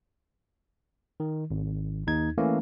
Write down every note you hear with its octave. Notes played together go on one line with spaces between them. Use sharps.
D#3
G#1
D#2 D#4 G#6
E3 A3 A#3 C#4